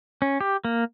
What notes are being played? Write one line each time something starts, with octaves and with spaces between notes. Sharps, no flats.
C#4
G4
A#3